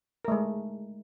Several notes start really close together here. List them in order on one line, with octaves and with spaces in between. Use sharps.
A#4 A3 G#3